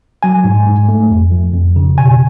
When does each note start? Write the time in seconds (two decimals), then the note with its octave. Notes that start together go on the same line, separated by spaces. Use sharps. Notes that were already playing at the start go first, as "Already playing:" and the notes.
0.23 F#3 G#5
0.44 G#2
0.67 G#2
0.89 A3
1.10 F2
1.31 F3
1.53 F2
1.76 C#3
1.98 B2 G#5